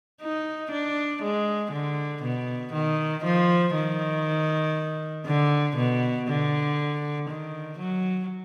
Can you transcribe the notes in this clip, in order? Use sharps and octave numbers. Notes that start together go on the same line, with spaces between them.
D#4
D4
G#3
D3
B2
D#3
F3
D#3
D3
B2
D3
D#3
F#3